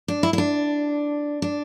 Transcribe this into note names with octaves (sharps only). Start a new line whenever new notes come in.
D4
E4
E4
D4
D4